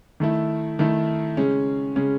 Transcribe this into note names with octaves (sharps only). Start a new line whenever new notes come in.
D#3 A3 E4
D#3 A3 E4
C#3 G#3 C#4
C#3 G#3 C#4